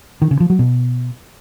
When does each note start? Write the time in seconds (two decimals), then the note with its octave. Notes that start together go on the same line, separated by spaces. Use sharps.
0.22 D#3
0.31 C#3
0.40 F3
0.50 F#3
0.59 B2